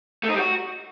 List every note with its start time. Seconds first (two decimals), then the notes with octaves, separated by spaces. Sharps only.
0.23 A3
0.29 D#4
0.34 G3
0.39 F#4